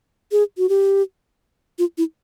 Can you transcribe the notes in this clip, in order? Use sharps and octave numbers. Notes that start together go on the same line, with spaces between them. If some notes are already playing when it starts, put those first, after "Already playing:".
G#4
F#4
G4
F4
E4